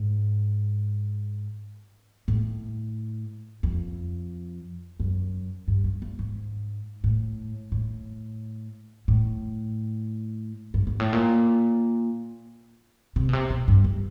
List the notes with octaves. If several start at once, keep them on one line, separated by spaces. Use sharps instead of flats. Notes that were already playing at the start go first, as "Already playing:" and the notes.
Already playing: G#2
A2
F2
F#2
G2
G2
G2
G#2
A2
A2
A2
G2
G#2
A2
A#2
C3
B2
C3
B2
G2
G2